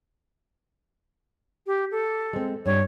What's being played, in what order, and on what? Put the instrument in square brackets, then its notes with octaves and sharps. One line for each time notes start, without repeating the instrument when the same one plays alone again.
[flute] G4
A4
[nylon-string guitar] G#3 C4
[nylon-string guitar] G2 [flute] C#5